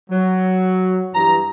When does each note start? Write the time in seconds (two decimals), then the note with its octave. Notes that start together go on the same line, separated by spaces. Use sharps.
0.10 F#3
1.14 G2 E3 A#5